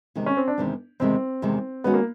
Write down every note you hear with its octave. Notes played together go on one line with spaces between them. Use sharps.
E2 C3 D#3 G#3 C4
C#4
C4
D4
E2 C3 D#3 G#3 C4
E2 C3 D#3 G#3 C4
E2 C3 D#3 G#3
D#3 G#3 B3 C#4 F#4
A#3